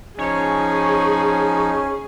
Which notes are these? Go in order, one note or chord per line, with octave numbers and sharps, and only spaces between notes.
F3 C#4 D#4 G#4 C#5